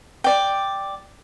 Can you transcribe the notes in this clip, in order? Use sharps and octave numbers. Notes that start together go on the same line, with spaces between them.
D5 G5